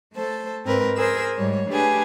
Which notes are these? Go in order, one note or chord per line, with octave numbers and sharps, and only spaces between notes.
A3 A4 C5
G#2 C4 A#4 B4
G#4 A#4 C5 E6
G#2 G3 C#5
A3 D4 G4 G#4 B4